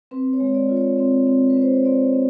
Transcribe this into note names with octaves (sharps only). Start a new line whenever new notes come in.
C4 B4
C#5
G#3
C#5
D5
F4
C#5
C4
C4
B4
C4
C5
C#5
C4 D5
C4